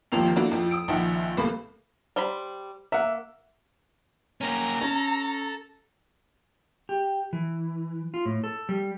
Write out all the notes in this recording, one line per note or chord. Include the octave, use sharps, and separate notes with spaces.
G#1 D#2 F3 A#3 C4 F7
A3 A#3 D4 E4 F#4
F2 F3
D#6 E6 D7
A#1 D#3 F3 E5 F#5
C2 A3 A#3 B5
G3 C5 B5
A#3 E5 F#5
A#3 C#4 A#5
C#4 A4
G4
E3
F4
A2
A4
G3